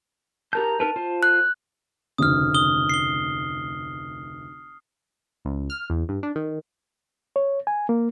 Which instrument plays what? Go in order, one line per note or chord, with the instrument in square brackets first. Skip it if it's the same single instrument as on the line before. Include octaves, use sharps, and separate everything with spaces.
[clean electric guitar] G4 A#4 A5 [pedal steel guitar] A#5 G6
[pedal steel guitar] D#4 A#4 B4 [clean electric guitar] A5
[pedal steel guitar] F4 C5
[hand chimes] F#6
[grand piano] F1 D2 C#3 [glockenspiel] D#6 F6
[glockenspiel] D#6 G7
C7 G7
[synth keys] C#2
F6
E2
G2
D4
D#3
[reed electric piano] C#5
G#5
A#3